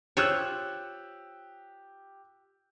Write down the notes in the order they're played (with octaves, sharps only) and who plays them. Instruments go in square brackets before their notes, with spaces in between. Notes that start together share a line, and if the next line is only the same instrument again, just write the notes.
[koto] F4 C5 C#5 [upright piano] G4 E6 F#6